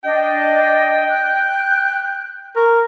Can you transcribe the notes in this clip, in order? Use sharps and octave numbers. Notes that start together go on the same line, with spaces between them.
D4 D#5 G5
F#6
A#4 C#6